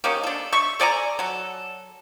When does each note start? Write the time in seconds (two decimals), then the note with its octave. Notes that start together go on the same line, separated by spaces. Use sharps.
0.04 A#3 C#4 D#4 G4
0.23 D4 A4
0.52 E5 C#6
0.80 A4 D5 G#5 A#5
1.19 F#3 A4